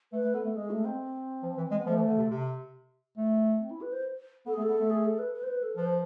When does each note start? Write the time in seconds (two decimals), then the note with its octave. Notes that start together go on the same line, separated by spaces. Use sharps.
0.13 A3 B4
0.24 A3
0.34 B3 A4
0.45 A3
0.56 G#3 G#4
0.71 A3
0.85 C4
1.43 F3
1.57 E3
1.71 G#3
1.79 B3
1.86 F3 A3
1.96 E3
2.07 D3
2.18 C3
2.30 C3
3.17 A3
3.60 C4
3.71 E4
3.82 B4
3.93 C5
4.46 B3 A4
4.54 G#4
4.58 A3
4.62 A4
4.69 B3
4.80 A3
4.90 G#4
5.05 A4
5.19 B4
5.34 B4
5.43 C5
5.48 B4
5.63 A4
5.77 F3 B4
5.85 C5